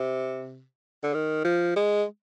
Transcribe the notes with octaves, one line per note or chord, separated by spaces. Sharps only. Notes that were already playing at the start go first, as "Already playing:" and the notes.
Already playing: C3
D3
D#3
F3
G#3